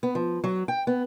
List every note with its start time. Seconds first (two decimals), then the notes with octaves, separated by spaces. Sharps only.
0.03 B3
0.15 F3
0.44 F#3
0.68 G5
0.87 B3